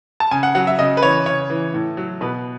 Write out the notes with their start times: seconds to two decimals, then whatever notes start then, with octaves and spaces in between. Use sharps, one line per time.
0.20 A5
0.31 C#3 G#5
0.43 F#5
0.55 F#3 F#5
0.67 E5
0.79 C#3 D#5
0.97 B4
1.02 E3 C#5
1.26 C#3 C#5
1.50 E3
1.74 A2
1.97 F#3
2.21 B2 B4